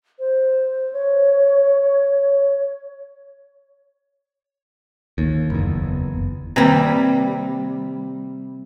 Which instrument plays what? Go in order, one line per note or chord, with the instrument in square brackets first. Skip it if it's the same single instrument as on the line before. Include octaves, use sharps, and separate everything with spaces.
[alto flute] C5
C#5
[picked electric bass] D#2
F#1 E2
[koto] C3 G3 [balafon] D#3 A#3 C4